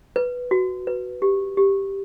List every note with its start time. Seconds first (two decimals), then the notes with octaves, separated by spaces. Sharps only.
0.16 B4
0.51 F#4
0.87 B4
1.22 G4
1.57 G4